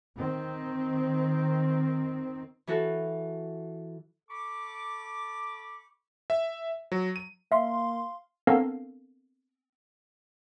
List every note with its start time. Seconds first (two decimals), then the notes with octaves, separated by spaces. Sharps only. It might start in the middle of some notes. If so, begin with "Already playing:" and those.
0.18 D#3 C4
2.67 E3 F#4 A4
4.29 A4 A5 B5 C#6 D6
6.30 E5
6.92 F#3
7.16 D#7
7.52 A#3 E5 F5 C6
8.47 B3 C4 D4 A4 A#4 F5